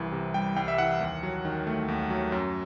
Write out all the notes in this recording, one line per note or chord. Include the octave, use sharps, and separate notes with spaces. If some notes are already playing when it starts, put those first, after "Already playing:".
Already playing: C2 E3
C3
G3 G5
C2 G5
E5
E3 F#5
D#2
F#3
D#3
A3
D#2
F#3
F#2